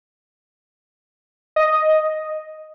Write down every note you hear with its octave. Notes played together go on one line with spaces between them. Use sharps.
D#5